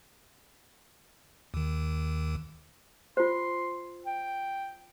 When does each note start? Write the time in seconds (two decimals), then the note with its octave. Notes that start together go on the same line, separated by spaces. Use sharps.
1.54 D#2 D#3
3.17 F4 C5 C6
4.06 G5